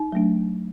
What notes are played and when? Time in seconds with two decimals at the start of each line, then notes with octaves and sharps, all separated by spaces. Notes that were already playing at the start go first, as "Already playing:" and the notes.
Already playing: D#4
0.12 F#3 A3 D4